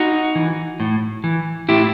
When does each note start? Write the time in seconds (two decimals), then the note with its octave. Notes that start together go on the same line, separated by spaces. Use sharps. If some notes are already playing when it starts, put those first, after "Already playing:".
Already playing: D#4 F#4
0.35 E3
0.80 A2
1.24 E3
1.69 A2 E4 G4